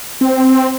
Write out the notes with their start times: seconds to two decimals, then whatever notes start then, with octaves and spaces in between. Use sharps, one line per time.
0.21 C4